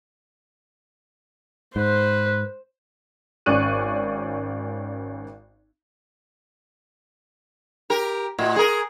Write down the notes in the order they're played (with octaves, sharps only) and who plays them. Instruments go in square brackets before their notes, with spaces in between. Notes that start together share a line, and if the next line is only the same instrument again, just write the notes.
[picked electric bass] G#2 [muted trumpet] B4 [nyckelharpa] C5
[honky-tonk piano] G#1 C#4 D5 C#6 F#6 D#7
[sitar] G4 A#4
A2 F#4
G#4 A#4